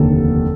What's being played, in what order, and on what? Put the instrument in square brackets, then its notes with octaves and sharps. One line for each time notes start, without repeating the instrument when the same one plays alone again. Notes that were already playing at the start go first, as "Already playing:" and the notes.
Already playing: [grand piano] F1 D#2 D3 A4